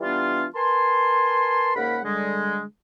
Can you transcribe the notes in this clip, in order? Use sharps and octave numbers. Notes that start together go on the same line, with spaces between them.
E3 G3 B3 D4 F4
A#4 B4 G#5 A5 C6
G#2 C#3 A#3 A#4 F#5 B5
D3 G3 G#3